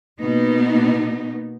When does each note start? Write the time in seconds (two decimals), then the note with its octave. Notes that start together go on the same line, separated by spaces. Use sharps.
0.19 B2 A#3 B3 D#4